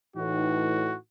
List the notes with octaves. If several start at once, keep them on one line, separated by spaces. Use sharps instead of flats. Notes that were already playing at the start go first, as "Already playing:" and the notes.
A2 E3 D#4 F#4